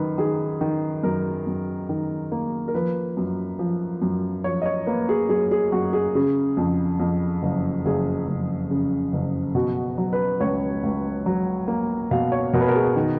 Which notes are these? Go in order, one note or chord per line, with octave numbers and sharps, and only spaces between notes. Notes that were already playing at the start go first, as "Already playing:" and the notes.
Already playing: F#2 D#3 B4
D#3 G#4
D#3
F#2 A#4
F#2
D#3
A#3
A#4
F3 B4
F#2
F3
F#2
F3 C#5
D#5
C#5
A#3 B4
G#4
F#2 G#4
G#4
F#2 F#4
G#4
C#3 G#4
F2
F2
F#1
F#1 G#4
F#1
C#3
F#1
B2 F#4
F#3
B4
C#2 C#5
C#2
F#3
A#3
B2 F5
C#5
B2 A#4
B4
A#4
G#4
D#3